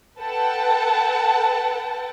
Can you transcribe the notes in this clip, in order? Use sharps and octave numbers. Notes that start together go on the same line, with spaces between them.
A4 B4 F#5 G5 A5